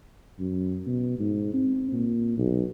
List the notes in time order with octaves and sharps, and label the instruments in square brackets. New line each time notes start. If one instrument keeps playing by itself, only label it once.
[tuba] F#2
B2
G#2
C4
A#2
B1